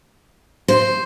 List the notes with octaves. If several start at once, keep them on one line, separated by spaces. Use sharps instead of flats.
C5